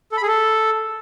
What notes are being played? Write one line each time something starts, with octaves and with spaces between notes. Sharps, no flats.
A4
B5
G#4
A4